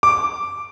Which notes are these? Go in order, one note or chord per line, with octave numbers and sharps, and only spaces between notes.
D6